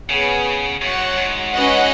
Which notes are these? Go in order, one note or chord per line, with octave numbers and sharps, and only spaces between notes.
C#3 B3 G#4 C#5
F#2 F#4 C#5 F#5
G#2
C#4 F#4 B4 D#5 F#5